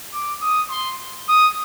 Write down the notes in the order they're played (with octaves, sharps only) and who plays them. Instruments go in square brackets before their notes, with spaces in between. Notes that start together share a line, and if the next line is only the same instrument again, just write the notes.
[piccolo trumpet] D6
D#6
C6
D#6